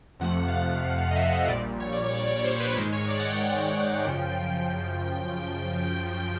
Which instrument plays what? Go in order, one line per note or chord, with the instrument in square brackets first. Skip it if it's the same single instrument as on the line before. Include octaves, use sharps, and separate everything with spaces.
[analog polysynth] F2 C3 F3 A3 F#5
F5
F#5
D#5
E5
D#5
A#1 A#2 G3 D5
C#5
D5
C#5
D5
C#5
C5
B4
G#2 D#3 G#3 C5
C#5
D5
F#5
G5
G5
F#2 C#3 F3 G5